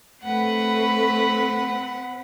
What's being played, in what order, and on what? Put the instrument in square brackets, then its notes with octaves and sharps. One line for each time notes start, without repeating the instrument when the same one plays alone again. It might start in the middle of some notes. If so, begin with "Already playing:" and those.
[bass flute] A3 [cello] C4 B4 [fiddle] F#5